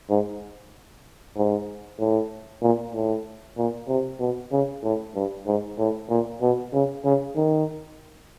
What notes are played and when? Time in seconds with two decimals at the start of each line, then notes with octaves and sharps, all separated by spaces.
0.10 G#2
1.37 G#2
1.99 A2
2.62 A#2
2.95 A2
3.57 A#2
3.88 C3
4.20 B2
4.52 C#3
4.84 A2
5.15 G2
5.47 G#2
5.79 A2
6.10 A#2
6.41 B2
6.73 C#3
7.05 C#3
7.36 D#3